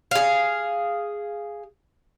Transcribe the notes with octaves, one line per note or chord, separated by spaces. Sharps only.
G#4 F5